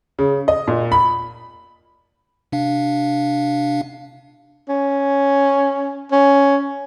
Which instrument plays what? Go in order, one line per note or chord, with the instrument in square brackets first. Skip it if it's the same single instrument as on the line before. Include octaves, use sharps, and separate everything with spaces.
[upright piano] C#3
D#5
A#2
B5
[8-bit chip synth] C3 D4 F5
[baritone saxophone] C#4
C#4